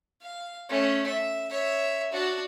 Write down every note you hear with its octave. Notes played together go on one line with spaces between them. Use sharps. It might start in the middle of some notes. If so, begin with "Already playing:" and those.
F5
A3 C#4
E5
C#5 E5
D4 F#4